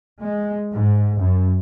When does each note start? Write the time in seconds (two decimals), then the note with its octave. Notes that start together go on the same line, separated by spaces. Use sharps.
0.25 G#3
0.71 G#2
1.17 F#2